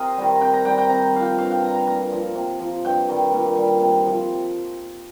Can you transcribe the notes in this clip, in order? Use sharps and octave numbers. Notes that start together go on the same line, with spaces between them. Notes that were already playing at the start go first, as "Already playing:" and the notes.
Already playing: C3 A#4 C5 D#5 F5
D#3 G3
C3 G5
A#5
D#3 G3 G5
G5
C3 A#5
F3 F5
G5
G2 F5
G5
G3 A#5
A#5
A#2 A#5
F3
C3
F3
G2 G5
D#3 G3
A#2
G3
C3
F3